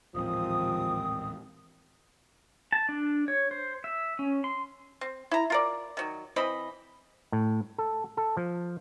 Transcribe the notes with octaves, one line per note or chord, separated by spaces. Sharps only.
D#1 A1 D#3 F3 G#3 C4 D#6
A5
D4
C#5
C5
E5
C#4
C6
C4
E4 A#5
F4 A#4 D5
D#3 F#3
E3 C4 D#5 B5
A2
A4
A4
F3